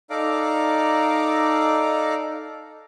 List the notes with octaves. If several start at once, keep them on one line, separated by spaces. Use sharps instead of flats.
D#4 A4 D5 F5 A#5 D6